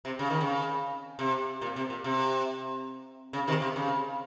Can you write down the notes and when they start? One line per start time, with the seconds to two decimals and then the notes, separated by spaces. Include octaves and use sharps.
0.05 C3
0.19 C#3
0.30 D#3
0.41 C#3
1.19 C3
1.61 A#2
1.76 C3
1.90 A#2
2.04 C3
3.33 C#3
3.47 C3 D#3
3.62 C3
3.76 C#3